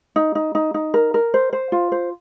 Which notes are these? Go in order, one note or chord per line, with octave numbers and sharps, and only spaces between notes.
D#4
D#4
D#4
D#4
A#4
A#4
C5
C5
F4
C5